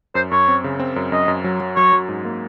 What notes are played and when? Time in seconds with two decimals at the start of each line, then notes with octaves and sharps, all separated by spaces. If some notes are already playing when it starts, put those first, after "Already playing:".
0.15 F#2 C5
0.31 F#2 C#5
0.48 C4
0.64 C#3
0.80 C4
0.96 F#2
1.12 F#2 D#5
1.28 F#2
1.44 F#3
1.60 F#3
1.76 F#3 C#5
1.93 F#3
2.09 G#2
2.25 A#3